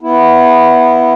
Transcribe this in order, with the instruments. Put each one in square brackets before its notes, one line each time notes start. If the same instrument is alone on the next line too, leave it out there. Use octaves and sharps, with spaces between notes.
[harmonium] B3 E4